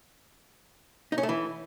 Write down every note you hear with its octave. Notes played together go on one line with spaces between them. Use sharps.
D#4
C#4
A3
E3